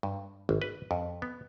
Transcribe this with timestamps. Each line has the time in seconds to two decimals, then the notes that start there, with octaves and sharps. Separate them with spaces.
0.03 G2
0.49 G#1
0.62 B4
0.91 F2
1.22 B3